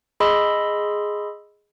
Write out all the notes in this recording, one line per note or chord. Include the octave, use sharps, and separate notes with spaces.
G#4 D#5 B5 C6 E6